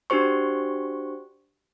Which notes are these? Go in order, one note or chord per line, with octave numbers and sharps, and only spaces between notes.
D4 F#4 G4 C5 C#6